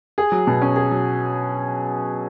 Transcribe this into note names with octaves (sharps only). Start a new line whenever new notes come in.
G#4
F#3
B2
C#4
G#4
F#3